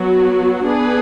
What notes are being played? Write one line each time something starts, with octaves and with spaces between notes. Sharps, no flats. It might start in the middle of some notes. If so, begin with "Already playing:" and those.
Already playing: F#3 B3 F#4
B3 D4 G#4 B4